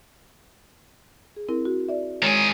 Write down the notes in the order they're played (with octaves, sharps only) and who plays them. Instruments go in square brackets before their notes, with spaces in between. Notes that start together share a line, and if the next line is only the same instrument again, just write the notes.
[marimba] G#4
C4 E4 A#4
F#4
D5 E5
[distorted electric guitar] D#3 G#4 [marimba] G#3 C#5